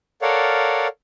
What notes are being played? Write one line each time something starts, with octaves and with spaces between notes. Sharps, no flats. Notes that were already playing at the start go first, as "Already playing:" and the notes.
A4 A#4 C#5 D5 F5 F#5